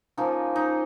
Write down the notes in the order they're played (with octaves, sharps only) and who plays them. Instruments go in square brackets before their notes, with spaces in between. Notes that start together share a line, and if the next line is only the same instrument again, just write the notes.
[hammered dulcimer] F3 A#3 C#4 D#4
D#4